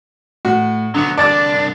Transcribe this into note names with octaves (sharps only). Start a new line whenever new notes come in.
A2 F#4
D3 F#3 B3 C#7
C2 D4 D5 A5 D6 A6